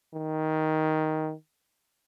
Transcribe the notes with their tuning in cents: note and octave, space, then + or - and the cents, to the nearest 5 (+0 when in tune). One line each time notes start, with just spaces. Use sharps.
D#3 +10